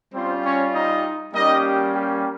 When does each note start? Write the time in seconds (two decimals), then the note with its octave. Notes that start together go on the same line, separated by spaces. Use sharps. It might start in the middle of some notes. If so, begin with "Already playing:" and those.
0.14 G3 C4 C#4 F4 C5
0.44 C#4 C#5
0.74 D#4 D#5
1.33 G3 A#3 C#4 D#4 G4 D#5
1.94 G4 G5